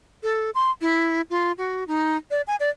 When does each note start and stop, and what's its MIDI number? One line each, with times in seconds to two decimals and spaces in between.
0.23 0.51 69
0.55 0.71 84
0.81 1.21 64
1.30 1.52 65
1.58 1.84 66
1.88 2.17 63
2.31 2.42 74
2.47 2.56 80
2.60 2.70 74